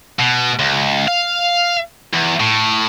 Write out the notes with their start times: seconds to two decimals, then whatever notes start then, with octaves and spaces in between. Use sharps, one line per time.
0.19 B2
0.59 C#2
1.08 F5
2.14 E2
2.40 A2